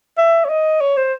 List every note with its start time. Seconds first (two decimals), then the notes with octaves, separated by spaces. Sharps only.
0.18 E5
0.45 C#5
0.49 D#5
0.81 C#5
0.97 C5